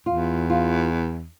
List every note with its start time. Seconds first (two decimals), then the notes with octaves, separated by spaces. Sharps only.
0.06 E2 F4
0.50 F4